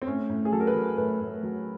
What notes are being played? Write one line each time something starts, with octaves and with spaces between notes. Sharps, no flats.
C4
A2 C#4
A2
G#4
F#3 A4
A#4
B4
F#3
A2 B4
A2
F#3